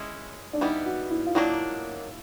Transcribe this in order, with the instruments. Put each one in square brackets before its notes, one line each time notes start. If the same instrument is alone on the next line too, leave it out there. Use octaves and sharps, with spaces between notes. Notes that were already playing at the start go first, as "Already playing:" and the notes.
Already playing: [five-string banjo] G#3 C#4 E4
[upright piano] D4
[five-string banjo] E3 G3 B3 [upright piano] D#4
[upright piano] F#4
E4
F4
[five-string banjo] D#3 F#3 A#3 D4 [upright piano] E4